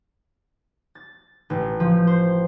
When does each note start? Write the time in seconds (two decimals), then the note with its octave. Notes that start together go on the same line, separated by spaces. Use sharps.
0.95 A6
1.50 A1
1.80 F3
2.07 C5